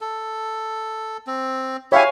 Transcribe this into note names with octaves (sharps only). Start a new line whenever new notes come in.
A4
C4
E4 G4 C#5 E5 F5 G#5